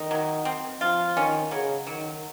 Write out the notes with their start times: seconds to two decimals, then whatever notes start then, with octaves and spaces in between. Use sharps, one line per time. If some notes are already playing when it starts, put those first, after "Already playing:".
Already playing: D#3 D#4
0.11 F#3
0.45 C4
0.81 F3 F4
1.16 D#3 C#4
1.51 C#3 F#3
1.87 D#3 F#3